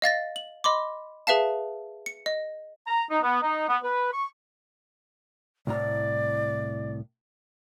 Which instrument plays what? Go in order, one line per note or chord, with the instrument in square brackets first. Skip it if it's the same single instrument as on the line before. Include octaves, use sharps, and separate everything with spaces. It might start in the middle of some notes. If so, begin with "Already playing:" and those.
[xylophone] D#5 F5 A6 A#6
F#7
D#5 B5 C6 D6
G#4 B4 E5 F5 A5
C#7
D#5
[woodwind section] A#5
D#4
B3
D#4
B3
B4
C#6
[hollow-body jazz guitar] C2 A2 A#5 [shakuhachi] D5